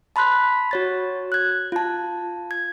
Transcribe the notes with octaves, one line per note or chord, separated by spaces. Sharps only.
A5 B5 C6 F#6 B6
F#4 C#5 A6
F#6 G#6
F4 A5
G#6